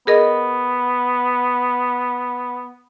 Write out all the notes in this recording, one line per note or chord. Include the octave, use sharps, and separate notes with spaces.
B3 G#4 A#4 D#5